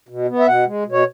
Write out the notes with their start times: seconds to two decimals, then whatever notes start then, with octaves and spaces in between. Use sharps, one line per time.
0.09 B2
0.28 B3
0.39 E5
0.46 B2 F#5
0.66 G#3
0.85 B2
0.92 C#5